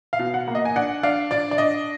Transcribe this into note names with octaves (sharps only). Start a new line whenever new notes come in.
F5
B2
F#5
A#3
D#5
G#5
D4 F#5
D4 F5
D4 D5
D5
D4 D#5